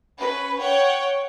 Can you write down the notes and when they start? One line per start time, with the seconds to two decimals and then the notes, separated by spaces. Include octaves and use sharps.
0.18 C#4 B4
0.59 C#5 F#5 G5